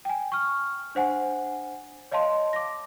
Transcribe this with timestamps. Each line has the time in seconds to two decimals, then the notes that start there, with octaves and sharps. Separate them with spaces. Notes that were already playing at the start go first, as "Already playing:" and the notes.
0.05 G5 G#5
0.32 C#6 F6
0.95 D4 C5 F#5 G#5
2.12 C#5 D#5 F5 A5 C6
2.53 D6 A#6